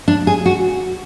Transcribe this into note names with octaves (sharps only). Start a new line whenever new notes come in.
D4
G#4
F#4